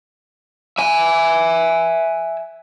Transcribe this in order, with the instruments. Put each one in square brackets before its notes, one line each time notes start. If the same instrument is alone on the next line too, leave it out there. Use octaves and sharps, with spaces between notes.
[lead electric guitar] E5 G#5